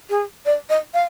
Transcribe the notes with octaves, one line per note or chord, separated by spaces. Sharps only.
G#4
D5
D#5
F5